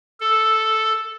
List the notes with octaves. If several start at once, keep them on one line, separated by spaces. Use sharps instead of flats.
A4